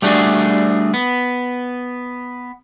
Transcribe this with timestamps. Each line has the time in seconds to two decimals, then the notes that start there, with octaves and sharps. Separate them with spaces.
0.02 G3 A3 D4 F#4 G#4
0.94 B3